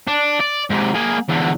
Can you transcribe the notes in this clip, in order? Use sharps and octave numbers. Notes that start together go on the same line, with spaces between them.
D4
D5
G#2 C3
A#3 G#4
E2 D3